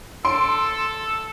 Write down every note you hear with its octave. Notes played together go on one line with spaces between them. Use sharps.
A4 C6 D7